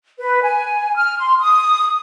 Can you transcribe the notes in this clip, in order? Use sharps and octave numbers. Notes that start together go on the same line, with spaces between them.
B4
G#5
F6
C6
D#6